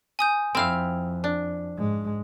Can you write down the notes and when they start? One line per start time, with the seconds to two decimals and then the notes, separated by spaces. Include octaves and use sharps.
0.19 G#5 D#6 G6
0.55 F2 C4 E4 F5 G5 F6
1.24 D4
1.77 G#2 G#3